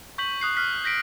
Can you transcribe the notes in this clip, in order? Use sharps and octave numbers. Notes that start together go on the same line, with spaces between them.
C#6 G6 B6 F#7
D#6 F#6 C7
F6 F#6 B6
G6 A#6 B6 D7